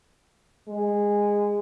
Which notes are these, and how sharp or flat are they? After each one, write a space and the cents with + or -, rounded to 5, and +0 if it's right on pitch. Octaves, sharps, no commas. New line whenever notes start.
G#3 -15